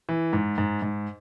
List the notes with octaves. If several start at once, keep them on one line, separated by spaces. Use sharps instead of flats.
E3
G#2
G#2
G#2